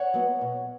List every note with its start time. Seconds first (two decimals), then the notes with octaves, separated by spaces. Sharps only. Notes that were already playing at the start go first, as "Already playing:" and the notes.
Already playing: C#5 F#5
0.14 F#3 B3
0.41 B2